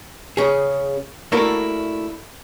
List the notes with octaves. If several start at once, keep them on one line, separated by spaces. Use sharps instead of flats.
C#3 G#4
A3 A#3 D4 E4 F#4 A#4